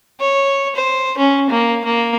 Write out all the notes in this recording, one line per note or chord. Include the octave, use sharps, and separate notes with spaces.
C#5
C5
C#4
A#3
A#3